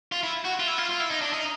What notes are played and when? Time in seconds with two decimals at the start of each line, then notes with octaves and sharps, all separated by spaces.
0.12 F4
0.23 E4
0.45 F#4
0.60 F4
0.67 E4
0.78 F4
0.89 F4
1.00 E4
1.10 D#4
1.22 D4
1.33 D#4